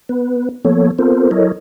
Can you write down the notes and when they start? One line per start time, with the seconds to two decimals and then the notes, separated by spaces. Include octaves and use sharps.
0.09 B3 B4
0.65 F3 A#3 B3 A4 C#5
0.99 B3 C4 F4 A4 A#4 C5
1.31 F#3 E4 A4 A#4 C#5 D#5